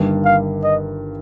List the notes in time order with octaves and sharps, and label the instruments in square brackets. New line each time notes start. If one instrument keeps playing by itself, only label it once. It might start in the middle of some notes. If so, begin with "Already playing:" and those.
Already playing: [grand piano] G1 G2 D#3 G3 A#3
[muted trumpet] F5
D#5